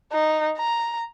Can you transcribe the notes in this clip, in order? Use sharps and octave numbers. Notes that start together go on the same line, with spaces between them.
D#4
A#5